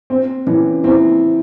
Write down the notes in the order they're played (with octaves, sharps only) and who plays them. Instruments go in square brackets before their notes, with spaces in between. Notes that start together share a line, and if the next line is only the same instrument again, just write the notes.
[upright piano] C4
[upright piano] E3 [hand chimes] C#4
[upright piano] C4 [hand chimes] E4